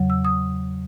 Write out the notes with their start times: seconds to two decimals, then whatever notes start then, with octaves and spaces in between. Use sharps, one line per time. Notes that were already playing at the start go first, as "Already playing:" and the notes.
Already playing: E2 C#3 F#3
0.10 E6
0.25 D#6